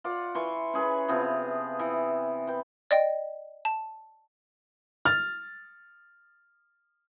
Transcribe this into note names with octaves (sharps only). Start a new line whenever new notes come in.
F4 D5 F#5
E3 C6 C#6
C#4 G#4 B4 A#5
C3 F3 B3
E3
B4 G5
D5 D#5 G5
A5
F6 A6